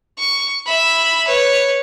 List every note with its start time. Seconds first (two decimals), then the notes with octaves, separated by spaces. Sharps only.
0.18 C#6
0.66 E5 B5
1.27 B4 C#5